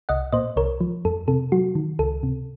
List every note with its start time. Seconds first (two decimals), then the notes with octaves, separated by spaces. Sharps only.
0.09 C2 D#5 F#5
0.32 A#2 C5 D#5
0.56 C2 A#4 C#5
0.81 F3
1.05 F2 A4
1.28 C3 A4
1.52 F#3 F#4
1.75 D#3
1.99 C#2 A4
2.23 C3